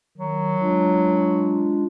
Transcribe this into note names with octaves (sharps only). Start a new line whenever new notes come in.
D#3 F#3
G#3 D4 F4